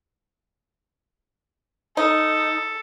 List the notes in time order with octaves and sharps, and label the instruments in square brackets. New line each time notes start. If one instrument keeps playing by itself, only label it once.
[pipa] D#4 [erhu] A4